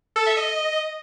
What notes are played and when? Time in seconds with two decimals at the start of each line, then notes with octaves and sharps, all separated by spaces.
0.16 A4
0.26 E5
0.37 D#5